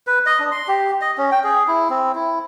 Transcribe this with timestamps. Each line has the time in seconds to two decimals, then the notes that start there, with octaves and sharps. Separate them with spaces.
0.07 B4
0.26 D#5
0.40 D4
0.51 C6
0.68 G4
1.01 D#5
1.18 C#4
1.32 G5
1.44 G#4
1.68 E4
1.90 C4
2.15 E4